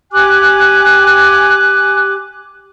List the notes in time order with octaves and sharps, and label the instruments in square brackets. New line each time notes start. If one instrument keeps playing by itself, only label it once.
[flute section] G4 G#5 D6 F#6